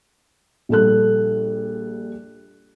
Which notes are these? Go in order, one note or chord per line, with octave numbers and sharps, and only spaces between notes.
A#1 G3 A4 F#6